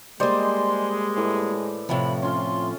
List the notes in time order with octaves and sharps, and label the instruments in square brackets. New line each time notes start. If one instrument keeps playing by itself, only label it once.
[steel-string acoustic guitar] G3 A#3 [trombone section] G#3 [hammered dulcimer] C5 D5 D#5 [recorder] C6
[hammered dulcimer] A2 E3
[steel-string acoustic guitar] A2 C3 F3 [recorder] B5
[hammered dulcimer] C#4 F4 [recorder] C6